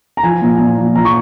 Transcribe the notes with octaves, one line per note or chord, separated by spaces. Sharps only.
A#5
F3 G#5
A#2
A#2
F3
F3 A#5
C#6